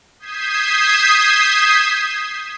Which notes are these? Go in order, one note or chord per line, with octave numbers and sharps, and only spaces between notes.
D#6 G6 G#6 B6 C7 E7